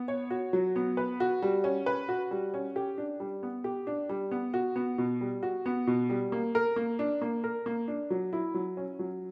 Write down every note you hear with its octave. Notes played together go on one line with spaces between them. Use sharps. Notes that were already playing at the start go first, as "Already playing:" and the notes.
Already playing: B3
C#5
F#4
F#3
B3
B4
F#4
G3
C#4
B4
F#4
G3
C#4
G4
D4
G3
B3
G4
D4
G3
B3
F#4
B3
B2
G3
F#4
B3
B2
G3
A#3
A#4
A#3
D4
A#3
A#4
A#3
D4
F#3
E4
F#3
C#4
F#3